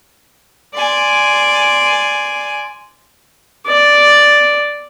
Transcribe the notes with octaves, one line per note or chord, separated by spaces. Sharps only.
D5 G#5 C6
D5